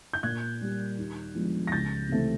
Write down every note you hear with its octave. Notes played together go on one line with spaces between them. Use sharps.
G6
A#2 F#6 G#6
G3 A#3
D#2
D3 F3 G#3 B3
A#6
C#2 G6 A6
C3 E3 A3 C4